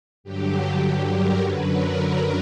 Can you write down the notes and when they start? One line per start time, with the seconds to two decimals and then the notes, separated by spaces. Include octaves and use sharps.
0.24 G2 D3 F#3 G4
0.82 G4
1.12 A#4
1.40 F#2 D3 F#3 B4
1.69 A#4
1.97 B4